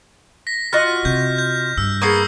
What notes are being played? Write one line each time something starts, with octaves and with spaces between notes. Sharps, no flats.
A#6 B6
F4 F#4 D#5 F6 A#6
C3 G6
G6
G2 E6
A#3 B3 G#4 C#6 D#6 C7